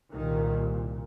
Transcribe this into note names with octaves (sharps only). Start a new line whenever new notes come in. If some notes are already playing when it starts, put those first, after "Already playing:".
C2 A#2 D#3